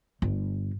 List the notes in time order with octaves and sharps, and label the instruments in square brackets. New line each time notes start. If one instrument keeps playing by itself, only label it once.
[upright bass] G1